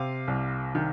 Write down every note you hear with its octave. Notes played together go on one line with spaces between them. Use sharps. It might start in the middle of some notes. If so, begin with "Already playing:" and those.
Already playing: C3 F5
C2
D#3